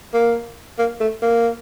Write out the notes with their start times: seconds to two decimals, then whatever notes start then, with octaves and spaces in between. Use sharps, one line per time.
0.14 A#3
0.78 A#3
1.00 A3
1.22 A#3